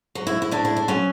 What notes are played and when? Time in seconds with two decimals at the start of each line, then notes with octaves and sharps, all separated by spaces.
0.15 F#3
0.27 E4
0.42 E4
0.51 A2 D4
0.65 E4
0.77 D4
0.88 F#3 C#4